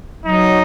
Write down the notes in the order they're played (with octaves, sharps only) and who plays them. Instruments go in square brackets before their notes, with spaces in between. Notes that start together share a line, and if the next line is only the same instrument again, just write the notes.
[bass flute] F#3 [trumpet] D#4